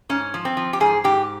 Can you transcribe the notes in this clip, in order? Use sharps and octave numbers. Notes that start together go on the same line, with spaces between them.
G#2 C#4
F3
C4
F3
G4
G#2 G#4
G#2 G4